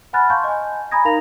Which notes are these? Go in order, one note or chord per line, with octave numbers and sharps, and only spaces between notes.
F#5 G#5 B5 F6 F#6 A6
F5 A5 C6 C#6 G6
D#5 G#5
G#5 A#5 B5 D#6 G#6 A#6
D#4 A#4 F5 A#5 A#6 F7